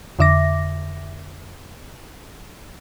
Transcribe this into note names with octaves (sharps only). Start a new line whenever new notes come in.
F2 D3 E5 D6 A#6